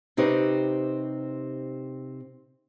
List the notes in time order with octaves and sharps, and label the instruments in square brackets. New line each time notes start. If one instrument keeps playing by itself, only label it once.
[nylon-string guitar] C3 C4 D#4 G4 B4 C#5